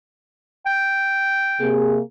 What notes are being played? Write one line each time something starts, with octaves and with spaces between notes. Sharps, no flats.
G5
C3 A#3 G#4